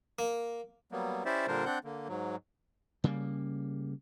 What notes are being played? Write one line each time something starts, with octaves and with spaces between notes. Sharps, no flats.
A#3
F#3 G3 A#3 B3
C#4 E4 G4 C5 D5 E5
A#2 D3 G3 D4 A#4 C5
C4 D4 F#5 G6
D3 A#3
G#2 F#3
C#3 G3 A#3